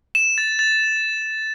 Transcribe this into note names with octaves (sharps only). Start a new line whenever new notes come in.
E7
A6
A6